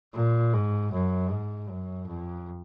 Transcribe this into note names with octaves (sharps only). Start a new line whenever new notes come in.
A#2
G#2
F#2
G#2
F#2
F2